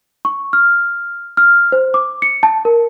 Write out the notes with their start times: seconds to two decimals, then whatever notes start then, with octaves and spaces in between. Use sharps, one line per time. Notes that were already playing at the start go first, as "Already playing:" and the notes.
0.25 C#6
0.53 F6
1.37 F6
1.72 C5
1.94 D6
2.22 C#7
2.43 A5
2.65 A#4